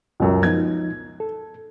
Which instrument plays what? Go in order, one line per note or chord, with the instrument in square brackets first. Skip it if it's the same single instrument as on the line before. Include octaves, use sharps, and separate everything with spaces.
[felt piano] C#2 F#2
[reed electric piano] F3 B3 D#4 [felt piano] G#6
[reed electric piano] A4